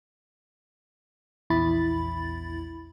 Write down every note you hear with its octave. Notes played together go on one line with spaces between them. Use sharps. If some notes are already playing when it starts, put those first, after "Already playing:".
A#1 E2 E4 B5 A6